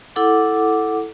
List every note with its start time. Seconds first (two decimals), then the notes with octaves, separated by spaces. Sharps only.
0.16 E4 A4 F#5 D6